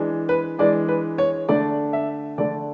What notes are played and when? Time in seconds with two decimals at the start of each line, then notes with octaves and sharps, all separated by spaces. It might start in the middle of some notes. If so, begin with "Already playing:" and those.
Already playing: E3 G#3 D4
0.29 B4
0.59 E3 G#3 D4 D5
0.88 B4
1.18 C#5
1.49 D3 A3 D4 D5
1.93 E5
2.38 D3 A3 D4 D5